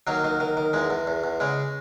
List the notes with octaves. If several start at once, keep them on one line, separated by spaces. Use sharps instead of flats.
D#3 F#3 A#3
D#3
D#3
D#3
E2 G#3
E2
E2
E2
C#3 G#3